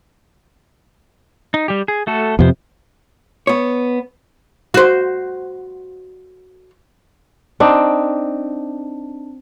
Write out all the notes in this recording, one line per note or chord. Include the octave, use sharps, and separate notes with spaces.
D#4
G3 G4
G#4
A3 F#4 A4
F2 C3 F3 B3 C5
B3 C#5
F#4 C5
C4 D4 D#4